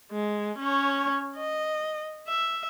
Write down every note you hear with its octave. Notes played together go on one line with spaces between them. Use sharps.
G#3
C#4 C#5
D#5
E5